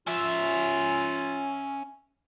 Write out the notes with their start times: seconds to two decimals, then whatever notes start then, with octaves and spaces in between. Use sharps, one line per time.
0.07 C#4 F4 E5